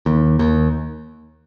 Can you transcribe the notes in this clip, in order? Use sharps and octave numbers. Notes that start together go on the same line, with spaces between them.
D#2
D#2